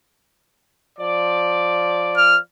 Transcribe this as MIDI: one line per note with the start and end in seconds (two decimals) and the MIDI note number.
0.98 2.37 53
0.98 2.37 74
2.17 2.39 89